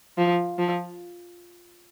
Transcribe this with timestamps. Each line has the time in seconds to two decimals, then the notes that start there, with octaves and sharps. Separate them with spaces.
0.18 F3
0.59 F3